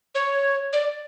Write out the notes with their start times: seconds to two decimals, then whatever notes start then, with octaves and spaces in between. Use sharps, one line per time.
0.15 C#5
0.73 D5